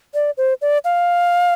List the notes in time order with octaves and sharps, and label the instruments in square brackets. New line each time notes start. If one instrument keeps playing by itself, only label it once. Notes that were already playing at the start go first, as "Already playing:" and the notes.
[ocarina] D5
C5
D5
F5